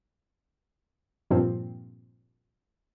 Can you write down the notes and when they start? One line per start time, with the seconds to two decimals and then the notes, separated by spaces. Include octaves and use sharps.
1.31 G2 A#2 F3 C4